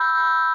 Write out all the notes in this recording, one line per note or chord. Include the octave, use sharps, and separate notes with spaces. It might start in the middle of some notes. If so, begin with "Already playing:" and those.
Already playing: B5 E6 G6